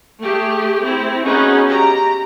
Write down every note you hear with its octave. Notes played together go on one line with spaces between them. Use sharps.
A3 G4 G#4
C4 E4
B3 C#4 D#4 F#4 G#4
G4 A#5